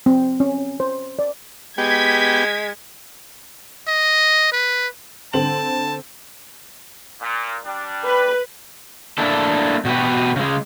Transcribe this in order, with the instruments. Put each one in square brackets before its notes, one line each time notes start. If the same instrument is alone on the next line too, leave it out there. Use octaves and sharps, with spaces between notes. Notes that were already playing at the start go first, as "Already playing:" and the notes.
[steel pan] C4
C#4
C5
D5
[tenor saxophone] G#3 [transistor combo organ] B3 G4 G5 [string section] G#6 B6
[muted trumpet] D#5
B4
[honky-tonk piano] D3 C4 F#7 [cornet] A5
[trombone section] A#2
G3 D4
[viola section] B4
[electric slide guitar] A#3 D4 E4 A4
B2 F#4 G4 B4
C#3 G#3